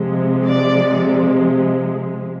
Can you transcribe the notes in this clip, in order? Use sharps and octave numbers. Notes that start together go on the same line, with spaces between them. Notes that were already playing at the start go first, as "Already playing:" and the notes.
Already playing: C3 F3 G#3
D5